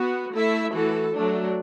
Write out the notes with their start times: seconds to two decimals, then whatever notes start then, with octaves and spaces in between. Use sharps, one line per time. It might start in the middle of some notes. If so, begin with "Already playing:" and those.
Already playing: B3 F#4
0.33 A3 E4 A4 E5
0.73 E3 A3 F#4 A4
1.13 F#3 A3 D4